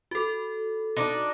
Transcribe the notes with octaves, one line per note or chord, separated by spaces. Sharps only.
F#4 A4
D4 D#4